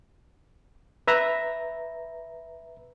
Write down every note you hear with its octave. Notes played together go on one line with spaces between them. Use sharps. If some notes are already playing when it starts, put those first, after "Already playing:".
B4 E5 A#5